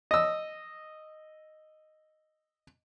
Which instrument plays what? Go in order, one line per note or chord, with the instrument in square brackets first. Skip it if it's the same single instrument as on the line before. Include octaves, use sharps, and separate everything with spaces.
[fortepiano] D#5 E6